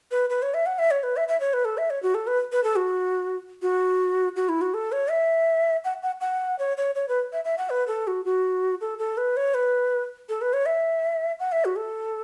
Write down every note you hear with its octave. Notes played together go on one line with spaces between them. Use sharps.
B4
B4
C#5
E5
F#5
E5
C#5
B4
E5
E5
C#5
B4
A4
E5
C#5
F#4
A4
B4
B4
A4
F#4
F#4
F#4
E4
F#4
A4
C#5
E5
F#5
F#5
F#5
C#5
C#5
C#5
B4
E5
E5
F#5
B4
A4
F#4
F#4
A4
A4
B4
C#5
B4
A4
B4
C#5
E5
F#5
E5
F#4
A4